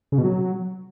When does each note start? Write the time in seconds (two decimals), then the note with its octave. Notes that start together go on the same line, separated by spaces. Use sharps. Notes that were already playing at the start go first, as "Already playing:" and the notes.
0.12 C#3
0.18 B2
0.24 F#3